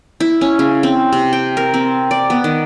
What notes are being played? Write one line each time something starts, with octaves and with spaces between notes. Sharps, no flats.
E4
C#4
C#3
C4
C3
G5
A#4
C4
D5
B3
D#3